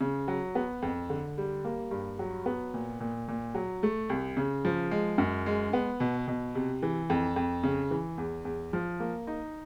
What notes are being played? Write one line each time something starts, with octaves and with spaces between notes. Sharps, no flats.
C#3
F#3
B3
F2
D3
G3
A#3
G2
F#3
B3
A#2
A#2
A#2
F#3
A3
C2
C#3
F3
G#3
F#2
G#3
B3
B2
B2
C3
E3
F2
F2
C#3
E3
E2
E2
F3
A#3
D#4